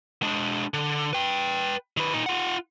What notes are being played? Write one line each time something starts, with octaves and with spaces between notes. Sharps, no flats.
G#3 D4
D3
B4 G5
D#3 B4
A#2 D#4
F4 F#5